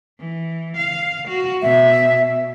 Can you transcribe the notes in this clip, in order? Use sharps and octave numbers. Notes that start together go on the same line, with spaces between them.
E3
F5
F#4
B2 E5